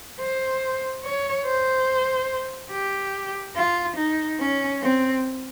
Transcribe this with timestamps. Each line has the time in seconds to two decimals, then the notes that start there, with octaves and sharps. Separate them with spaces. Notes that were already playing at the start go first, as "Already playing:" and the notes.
0.20 C5
1.04 C#5
1.46 C5
2.71 G4
3.56 F4
3.97 D#4
4.40 C#4
4.82 C4